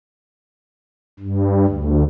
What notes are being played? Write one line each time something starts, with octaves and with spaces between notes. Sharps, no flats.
G2
D2